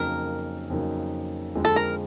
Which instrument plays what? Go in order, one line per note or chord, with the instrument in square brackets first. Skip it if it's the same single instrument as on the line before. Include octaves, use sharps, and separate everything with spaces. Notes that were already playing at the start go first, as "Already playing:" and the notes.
Already playing: [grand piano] F2 C#3 F#3 A#3 D#4 [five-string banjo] A#4
[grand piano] F2 C#3 F#3 A#3 D#4
F2 D3 F3 G#3
[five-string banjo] A4
A#4